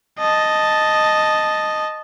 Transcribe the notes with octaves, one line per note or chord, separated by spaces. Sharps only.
D#5 A5